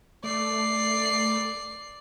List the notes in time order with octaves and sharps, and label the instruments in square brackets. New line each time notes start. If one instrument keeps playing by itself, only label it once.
[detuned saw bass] A3 [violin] D5 C7